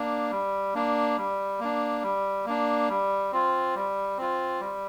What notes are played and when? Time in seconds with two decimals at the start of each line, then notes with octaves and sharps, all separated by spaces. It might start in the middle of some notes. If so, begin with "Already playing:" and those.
Already playing: A#3 D4
0.31 G3
0.74 A#3 D4
1.17 G3
1.60 A#3 D4
2.03 G3
2.46 A#3 D4
2.89 G3
3.32 C4 F4
3.75 G3
4.18 C4 F4
4.60 G3